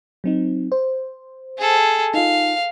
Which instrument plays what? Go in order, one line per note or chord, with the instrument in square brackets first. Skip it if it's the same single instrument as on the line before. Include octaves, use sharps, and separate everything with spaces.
[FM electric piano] F#3 C4 D#4
C5
[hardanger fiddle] G#4 A4
[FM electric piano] D#4 F4 [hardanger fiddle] F5